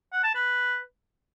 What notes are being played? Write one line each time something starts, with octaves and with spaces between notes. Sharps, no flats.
F#5
A5
B4